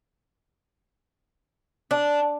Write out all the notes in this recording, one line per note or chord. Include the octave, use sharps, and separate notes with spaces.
D4